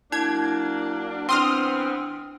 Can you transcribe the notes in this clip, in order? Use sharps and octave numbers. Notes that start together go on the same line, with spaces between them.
F#3 A#3 D4 E4 G#6
E3 B3 C4 D4 C6 D#6 F6